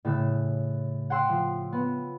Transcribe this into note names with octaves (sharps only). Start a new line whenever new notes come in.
A2 C#3 A4 F#6
F#5 G5 C6 E6
F3
B3